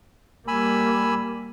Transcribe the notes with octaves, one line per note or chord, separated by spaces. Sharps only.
G3 A#3 G#5 B5 E6